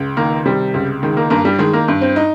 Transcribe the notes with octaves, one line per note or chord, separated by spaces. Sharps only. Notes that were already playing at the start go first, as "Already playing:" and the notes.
Already playing: C#2
D#3 A#3
C3 G3
C#2
D#3 G#3
A#3
G2 A#3
G3
D#3 G#3
A#3
G2
C4
D#4